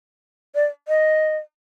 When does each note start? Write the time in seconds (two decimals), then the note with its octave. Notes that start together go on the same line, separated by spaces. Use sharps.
0.55 D5
0.88 D#5